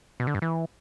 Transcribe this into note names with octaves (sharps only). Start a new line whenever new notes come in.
B2
D3
G2
E3